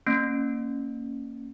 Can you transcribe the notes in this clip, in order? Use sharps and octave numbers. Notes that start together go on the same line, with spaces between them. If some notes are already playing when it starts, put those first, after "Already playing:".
A#3 C#4